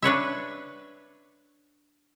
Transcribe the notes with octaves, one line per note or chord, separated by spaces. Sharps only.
D4 B4 C#5 E5